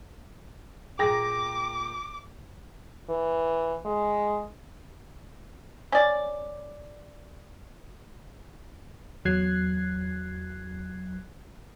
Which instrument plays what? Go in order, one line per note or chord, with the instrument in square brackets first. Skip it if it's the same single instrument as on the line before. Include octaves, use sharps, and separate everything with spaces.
[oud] A#2 G#4 [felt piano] G5 A#6 [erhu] D6
[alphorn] E3
G#3
[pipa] C#4 D5
[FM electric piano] E2 F#3 F#6 G#6 C7